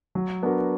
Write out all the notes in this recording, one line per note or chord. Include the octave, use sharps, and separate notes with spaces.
F#3
B3 D4 F#4 A#4